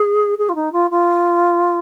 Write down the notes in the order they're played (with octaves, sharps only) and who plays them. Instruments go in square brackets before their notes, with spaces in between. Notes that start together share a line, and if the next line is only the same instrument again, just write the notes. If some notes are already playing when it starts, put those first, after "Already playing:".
Already playing: [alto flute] G#4
G#4
F4
D#4
F4
F4